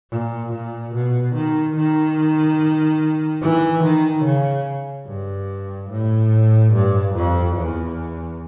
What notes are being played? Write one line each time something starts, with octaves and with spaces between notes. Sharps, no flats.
A#2
A#2
B2
D#3
D#3
E3
D#3
C#3
G2
A2
G2
F2
E2